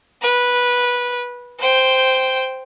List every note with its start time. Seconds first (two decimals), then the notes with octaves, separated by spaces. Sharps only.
0.22 B4
1.59 C5 G5